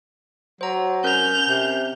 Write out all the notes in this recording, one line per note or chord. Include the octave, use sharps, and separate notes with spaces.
F#3 C5 A#5
C#4 A#4 G6 F7
C3